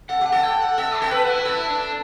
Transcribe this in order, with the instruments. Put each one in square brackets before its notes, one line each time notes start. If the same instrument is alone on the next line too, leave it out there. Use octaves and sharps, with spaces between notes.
[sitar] A4 [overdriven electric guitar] F#5
[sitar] G4 [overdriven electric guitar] F#5
[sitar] A4
[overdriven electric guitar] G5
F#5
[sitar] A4 [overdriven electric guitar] E5
[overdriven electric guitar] G4 [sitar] A4
[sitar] B4
[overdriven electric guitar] F#4
E4
F#4
[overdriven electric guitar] E4 [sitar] A4
[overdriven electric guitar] D4